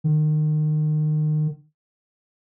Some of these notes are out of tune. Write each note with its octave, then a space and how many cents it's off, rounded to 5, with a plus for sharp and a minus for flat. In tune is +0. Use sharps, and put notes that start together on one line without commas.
D#3 -30